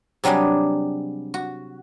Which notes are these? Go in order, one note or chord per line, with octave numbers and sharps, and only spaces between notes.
C3 F#3 G3 D4 G#4
F#4